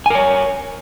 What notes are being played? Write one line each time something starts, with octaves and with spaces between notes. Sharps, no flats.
A#4 C#5 G#5